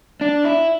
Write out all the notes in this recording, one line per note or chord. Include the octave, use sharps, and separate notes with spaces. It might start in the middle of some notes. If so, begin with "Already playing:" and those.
D4
E4